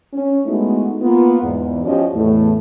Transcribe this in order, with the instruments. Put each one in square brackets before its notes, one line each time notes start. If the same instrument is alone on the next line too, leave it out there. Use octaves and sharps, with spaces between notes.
[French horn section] C#4
G#3 A3 B3 D#4 E4 F#4
A#3 B3 F4
E2 G#2
F3 C#4 F#4 G4 D5 D#5
E2 A2 A3